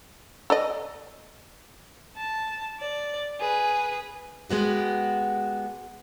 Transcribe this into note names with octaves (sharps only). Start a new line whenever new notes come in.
A4 D5 D#5
A5
D5
G#4 B4
G#3 B3 F#4 G4